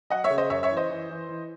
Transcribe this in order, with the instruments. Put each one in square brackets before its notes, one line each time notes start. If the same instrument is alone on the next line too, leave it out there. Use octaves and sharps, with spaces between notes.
[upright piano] F#3 D#5 F#5
C#5 E5
C#3
C5 D#5
F#2 C#5 E5
C#5 E5
E3
C5 D#5
E3
E3
E3